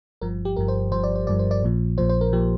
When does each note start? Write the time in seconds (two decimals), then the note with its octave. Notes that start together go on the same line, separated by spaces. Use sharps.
0.21 G1 G2 F3 A#4
0.45 G4
0.56 G1 G2 F3 A#4
0.68 C5
0.92 G1 G2 F3 C5
1.03 D5
1.15 C5
1.27 G1 G2 F3 D5
1.39 C5
1.51 D5
1.62 A#1 A#2 F3
1.98 A#1 A#2 F3 C5
2.09 C5
2.21 A#4
2.33 A#2 F3 G4